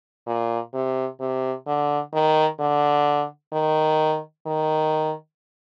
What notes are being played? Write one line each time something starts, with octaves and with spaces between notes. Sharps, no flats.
A#2
C3
C3
D3
D#3
D3
D#3
D#3